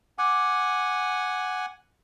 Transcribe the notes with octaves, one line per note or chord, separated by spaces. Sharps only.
F#5 G#5 D6